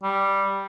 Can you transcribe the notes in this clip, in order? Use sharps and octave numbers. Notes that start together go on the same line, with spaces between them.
G3